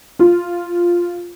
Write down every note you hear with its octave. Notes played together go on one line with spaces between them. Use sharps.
F4